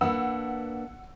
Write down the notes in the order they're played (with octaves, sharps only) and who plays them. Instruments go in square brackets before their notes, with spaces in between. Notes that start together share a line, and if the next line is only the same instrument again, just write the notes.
[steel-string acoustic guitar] A#3 D4 B4 [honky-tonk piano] F#5 E6